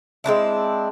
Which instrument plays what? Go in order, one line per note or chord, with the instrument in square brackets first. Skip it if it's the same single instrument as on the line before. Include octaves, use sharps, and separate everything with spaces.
[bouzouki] G#3 C4 D4 E4